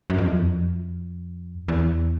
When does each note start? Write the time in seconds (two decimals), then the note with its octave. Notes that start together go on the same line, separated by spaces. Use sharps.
0.10 F#2
0.18 F2
0.26 E2
0.34 F2
1.68 E2